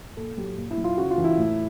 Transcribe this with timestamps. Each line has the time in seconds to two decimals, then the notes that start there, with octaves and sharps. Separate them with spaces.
0.17 A#2 A4
0.37 F#3 G4
0.57 A#2
0.71 E4
0.77 F#3
0.84 F4
0.97 C#3 F#4
1.10 F4
1.18 E3
1.24 E4
1.38 A2